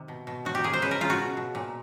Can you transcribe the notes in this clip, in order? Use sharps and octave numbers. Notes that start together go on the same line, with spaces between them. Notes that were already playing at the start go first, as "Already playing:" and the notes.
Already playing: C3 D#3
B2
B2
D#3 F#4
G4
D#3 G#4
C5
C#3 B4
A#4
C#3 F4
F#4
B2
B2
A#2